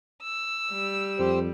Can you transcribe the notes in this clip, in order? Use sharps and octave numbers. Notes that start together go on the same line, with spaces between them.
E6
G3
F2 G4 C5